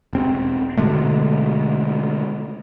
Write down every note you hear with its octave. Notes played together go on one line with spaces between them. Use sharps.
E1 C4
B2 D3 G#3 A3